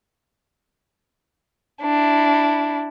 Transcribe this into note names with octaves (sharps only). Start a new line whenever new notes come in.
D4 E4